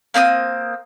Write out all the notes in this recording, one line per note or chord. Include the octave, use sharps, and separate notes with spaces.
A#3 C4 C6 D#6